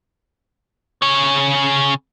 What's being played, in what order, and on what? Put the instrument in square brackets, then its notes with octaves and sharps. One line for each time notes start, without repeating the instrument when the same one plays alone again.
[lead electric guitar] C#3 C#5